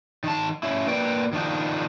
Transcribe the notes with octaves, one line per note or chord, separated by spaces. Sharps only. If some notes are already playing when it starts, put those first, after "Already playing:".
D#3 A5
C#4 E4
A#3 B4 D5 G5
D#3 F3 D4 D#4